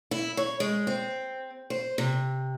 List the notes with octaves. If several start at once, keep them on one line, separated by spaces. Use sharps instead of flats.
E4
C#5
G#3
C4
C5
C3